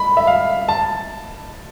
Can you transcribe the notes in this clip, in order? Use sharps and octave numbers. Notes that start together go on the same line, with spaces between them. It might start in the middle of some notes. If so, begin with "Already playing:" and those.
Already playing: B5
E5
F5
A5